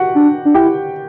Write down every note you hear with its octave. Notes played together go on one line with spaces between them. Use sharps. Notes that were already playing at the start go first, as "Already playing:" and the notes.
Already playing: F#4 G4 F#5
D4
D4
E4 G4 G5